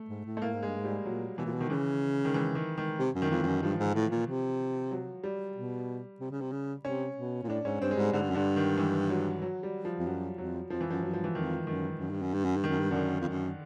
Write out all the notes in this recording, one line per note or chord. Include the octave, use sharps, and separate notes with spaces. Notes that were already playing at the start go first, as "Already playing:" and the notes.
Already playing: A3
G#2
A2
A3
A2 A#3
G#2
G2 G#3
G#2
G3
A#2 F#3
B2 E3
A#2
B2
D#3
C#3 E3
D#3
E3
D#3
D#3
C3
F#2
D#3
F2 E3
F2
F#2
G2 F3
G#2
A2
A#2
C3
F#3
G3
B2
C3
C#3
C3
C#3
C3 C#4
B2
A#2
A2 D4
G#2 C#4
G2 C4
G#3
G#2 G3
G#2 D3
G2
F#2
G2 D3
D#3
E3
F#3
F#3
G3
F3
F2
F#2 F#3
F2 F#3
F2 F3
E3
F#2 F3
F#2 F#3
G2 F3
E3
F2 D#3
F#2 D#3
F#2
G2
F#2
G2
F#2
G2
F#2 D#3
G2
F#2 D3 D#3
F2
F#2